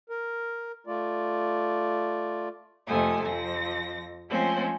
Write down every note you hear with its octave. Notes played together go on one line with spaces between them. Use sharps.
A#4
A3 F4 D5
F2 C3 A3 A4 G#5 D#6
F2 F3 A#6
F3 G#3 A3 C4 C#4 C5